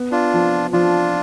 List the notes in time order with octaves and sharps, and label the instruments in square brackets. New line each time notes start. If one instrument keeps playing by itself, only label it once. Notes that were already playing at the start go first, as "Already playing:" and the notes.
Already playing: [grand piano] B3
[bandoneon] D4 F4
[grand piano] F3
[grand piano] F3 [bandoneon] D4 F4